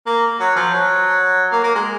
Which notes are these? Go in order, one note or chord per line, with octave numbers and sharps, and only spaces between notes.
A#3
F#3
F3
F#3
A#3
A#3
G#3